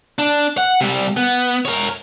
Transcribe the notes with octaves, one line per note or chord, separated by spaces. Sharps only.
D4
F#5
C3 G3
B3
A#4 C#5